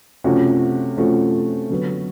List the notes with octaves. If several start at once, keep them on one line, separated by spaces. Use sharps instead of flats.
C3 F3 A3 C#4 F#4
C3 F3 A3 C#4 F#4
D3 F#3 B3